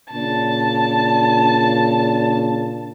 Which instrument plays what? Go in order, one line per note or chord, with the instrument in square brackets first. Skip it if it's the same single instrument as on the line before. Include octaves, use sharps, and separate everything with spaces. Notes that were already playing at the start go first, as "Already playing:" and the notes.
[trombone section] A#2 C#3 D4 [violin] A5